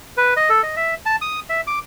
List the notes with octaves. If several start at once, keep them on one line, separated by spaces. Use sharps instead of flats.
B4
D#5
A4
D#5
E5
A5
D#6
E5
D6